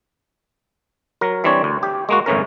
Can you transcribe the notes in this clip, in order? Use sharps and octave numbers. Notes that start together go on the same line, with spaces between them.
F#3 A#4
E3 G3 C4 D4 C#5
D2
G4
G#3 A#3 F#4
G1 A2 E3 C#4 A#4